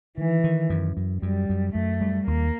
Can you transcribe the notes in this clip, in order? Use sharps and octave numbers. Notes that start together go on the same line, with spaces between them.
D#3 E3
D#3
F#2
F#2
F#2 G3
F#2
F#2 A3
G3
D#2 A#3